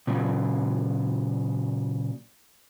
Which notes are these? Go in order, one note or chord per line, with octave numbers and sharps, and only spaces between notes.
A#2 C#3 F#3